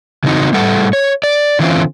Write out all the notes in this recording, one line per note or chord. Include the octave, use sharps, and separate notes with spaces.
C#3 E3 C4 D#4 F#4
A2 G3 A3 A4 F#5
C#5
D5
D3 E3 C4 C#4 F4